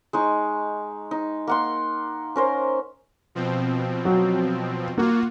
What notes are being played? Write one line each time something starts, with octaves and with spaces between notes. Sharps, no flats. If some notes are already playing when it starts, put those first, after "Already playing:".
G#3 D#4 C#6
D#4
A#3 F#5 C6
C#4 A#4 C5
B2 F3 C4
F#3
A#3 F4 F#4